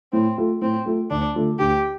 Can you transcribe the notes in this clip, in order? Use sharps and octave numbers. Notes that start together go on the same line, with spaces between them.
A2 C4
A3 F4
A2 C4
A3 F4
D2 D4
D3 A3 F4
D2 G4